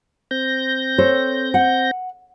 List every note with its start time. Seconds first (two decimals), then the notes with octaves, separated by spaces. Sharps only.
0.31 C4 G6 A#6
0.98 A4 C5 C#5
1.54 F#5